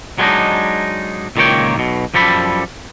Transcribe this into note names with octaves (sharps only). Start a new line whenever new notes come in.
F#3 G#3 B3 C4 D4 D#4
C#2 A#2 D#3 A#3 C#5 G5
B1 B2
F#2 F3 G3 A4 B5